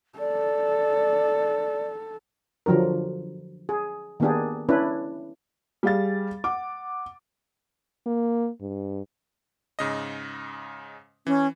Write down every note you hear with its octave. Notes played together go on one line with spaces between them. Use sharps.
A4 D5
D3 F3 F#3 D4 A#4
G#4
D#3 A#3 B3 D4 G4 G#4
C#4 D4 E4 B4
G3 G#4 F5 A6
F#5 D6
A#3
G2
G#2 C#3 D#5
E3 C#4